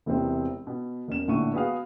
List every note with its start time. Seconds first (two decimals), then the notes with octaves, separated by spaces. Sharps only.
0.06 E1 C3 E3 C4
0.67 B2
1.08 E1 C#4 A#4 E7
1.28 A#1 A2 D3 G#3 C#6 D#7
1.53 B3 F#4 G#4 B4 F5